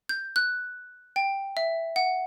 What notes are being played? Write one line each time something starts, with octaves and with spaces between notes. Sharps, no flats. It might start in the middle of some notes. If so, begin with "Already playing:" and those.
G6
F#6
G5
E5
F#5